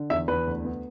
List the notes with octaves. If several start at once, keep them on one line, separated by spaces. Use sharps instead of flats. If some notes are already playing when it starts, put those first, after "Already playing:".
Already playing: D3
E2 E5
E2 B4
D2
B3